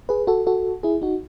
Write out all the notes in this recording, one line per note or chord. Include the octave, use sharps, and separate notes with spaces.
G#4 B4
F#4 A4
F#4 A4
E4 G#4
D#4 F#4